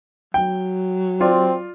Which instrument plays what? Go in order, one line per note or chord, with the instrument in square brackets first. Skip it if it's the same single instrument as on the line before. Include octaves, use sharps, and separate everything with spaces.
[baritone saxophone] F#3 [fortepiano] G5
[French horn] C4 [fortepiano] F4 D5